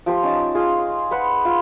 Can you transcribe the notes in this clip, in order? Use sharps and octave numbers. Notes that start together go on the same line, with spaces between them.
F3 G4 C5
C#4 D#4 A5
F4 G#4
C6
B4 C5 F#5
F4